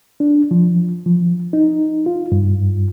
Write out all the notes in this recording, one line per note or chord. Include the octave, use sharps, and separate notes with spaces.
D4
F3
F3
D#4
F4
G2